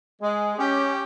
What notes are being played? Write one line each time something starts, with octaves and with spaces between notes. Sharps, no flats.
G#3
C#4 G4